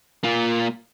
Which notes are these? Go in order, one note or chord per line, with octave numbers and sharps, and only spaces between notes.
A#3 F4